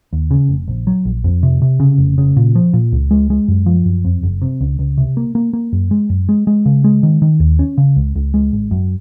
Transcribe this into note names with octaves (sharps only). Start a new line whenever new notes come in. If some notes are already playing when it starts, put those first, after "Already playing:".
D#2
C#3
F1
A#1
F#3
A#1
F2
C3
C3
C#3
F1
C#3
A#2
F3
A#2
C#2
G#3
G#3
F#2
F3
F#2
F2
F#1
C3
C#2
C#2
C3
A#3
A#3
A#3
F#2
G#3
F#2
G#3
G#3
C#3
G#3
D#3
D#3
D#2
C#4
C#3
C#2
C#2
G#3
G#1
F#2